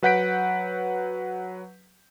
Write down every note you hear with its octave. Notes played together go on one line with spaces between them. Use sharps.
F#3 B4 F#5 G6 B6 D7